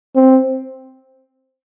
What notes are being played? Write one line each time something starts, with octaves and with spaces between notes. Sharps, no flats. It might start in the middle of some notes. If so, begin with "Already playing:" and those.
C4